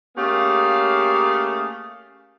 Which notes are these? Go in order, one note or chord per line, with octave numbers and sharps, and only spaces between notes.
A3 A#3 C#4 G4 G#4 F5